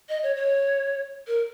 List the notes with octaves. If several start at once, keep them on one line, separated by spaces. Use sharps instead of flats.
D#5
C#5
C#5
A#4